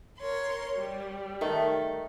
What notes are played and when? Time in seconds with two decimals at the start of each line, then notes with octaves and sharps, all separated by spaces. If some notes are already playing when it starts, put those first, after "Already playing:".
0.18 A#4 C#5 C6
0.75 G3
1.41 D#3 A3